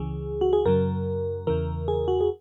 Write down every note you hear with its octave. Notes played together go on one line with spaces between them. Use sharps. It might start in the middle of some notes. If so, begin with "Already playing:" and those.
Already playing: C#2 C#3 E3 G#4
F#4
G#4
F#2 C#3 F#3 A#4
E2 C#3 E3 A#4
G#4
F#4
G#4